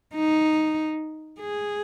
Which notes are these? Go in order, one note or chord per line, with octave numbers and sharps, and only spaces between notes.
D#4
G#4